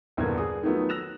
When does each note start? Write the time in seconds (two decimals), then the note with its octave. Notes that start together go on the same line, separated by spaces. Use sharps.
0.17 A#1 E2 G2 D3 A#4 G#6
0.38 G#4 D#6
0.63 D#3 F3 F#3 A3 B3
0.89 E6 F#6 A#6 E7 F7